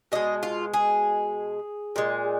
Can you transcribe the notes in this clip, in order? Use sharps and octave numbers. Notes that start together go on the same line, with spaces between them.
B2 G#3 D#5
F4
G#4
A#2 G#3